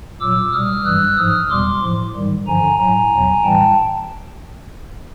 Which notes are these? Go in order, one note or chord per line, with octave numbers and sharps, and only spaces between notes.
A#2 F#3 D6 E6
B2 G3 D#6 F6
G2 E3 G3 E6 F#6
G#2 F3 D#6 F6
E2 B2 G3 C6 D6
A2 F3
G#2 D#3 G3
G2 D3 F3 G#5 A#5
A2 F#3 G#5 A#5
E2 B2 F#3
A2 E3 G3 G5 A5